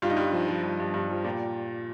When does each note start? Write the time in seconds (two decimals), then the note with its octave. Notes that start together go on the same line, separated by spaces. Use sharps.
0.02 G2 F4
0.10 D#4
0.16 G2 F4
0.33 F3
0.48 F3
0.63 G2
0.79 G2
0.94 G2
1.10 F3
1.24 A#2 G4